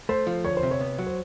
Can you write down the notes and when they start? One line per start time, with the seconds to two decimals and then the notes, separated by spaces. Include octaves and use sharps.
0.09 A3 C5
0.27 F3
0.44 D2 C#5
0.57 C5
0.63 C3
0.71 C#5
0.81 B3
0.99 F#3
1.06 C5